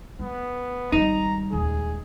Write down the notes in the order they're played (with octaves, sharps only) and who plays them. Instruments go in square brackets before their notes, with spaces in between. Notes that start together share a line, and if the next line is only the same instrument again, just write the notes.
[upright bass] A3 [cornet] B3
[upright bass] G#1 G3 [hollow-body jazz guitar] D#4 [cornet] A#5
[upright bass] D#1 C#2 [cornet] G#4